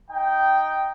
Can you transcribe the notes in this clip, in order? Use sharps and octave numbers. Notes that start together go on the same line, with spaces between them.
D#4 G5